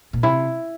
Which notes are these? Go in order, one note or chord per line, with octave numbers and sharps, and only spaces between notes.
A#2
C3 E4